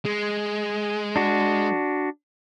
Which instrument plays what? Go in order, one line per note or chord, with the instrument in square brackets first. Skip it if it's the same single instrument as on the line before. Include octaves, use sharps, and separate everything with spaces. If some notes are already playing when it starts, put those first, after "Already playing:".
[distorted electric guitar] G#3
[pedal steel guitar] D4 F#4